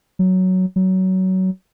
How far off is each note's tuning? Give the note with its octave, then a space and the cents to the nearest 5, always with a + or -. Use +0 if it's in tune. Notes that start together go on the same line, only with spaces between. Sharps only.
F#3 +5
F#3 +20